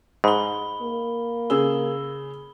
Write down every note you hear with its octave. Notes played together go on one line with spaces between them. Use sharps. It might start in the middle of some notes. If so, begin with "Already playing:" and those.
G#2 B5 G7
A#3
C#3 G#4 E6 G7